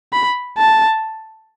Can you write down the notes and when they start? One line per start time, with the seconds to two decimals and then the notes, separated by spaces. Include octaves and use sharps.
0.13 B5
0.58 A5